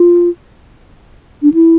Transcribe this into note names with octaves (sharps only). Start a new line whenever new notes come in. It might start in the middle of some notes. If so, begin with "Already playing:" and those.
Already playing: F4
D4
E4